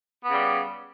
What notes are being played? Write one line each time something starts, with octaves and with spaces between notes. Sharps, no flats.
C#3 G3 B3